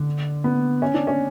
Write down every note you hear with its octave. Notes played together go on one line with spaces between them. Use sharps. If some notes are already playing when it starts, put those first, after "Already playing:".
Already playing: D3
B3
C#4
D4
C#4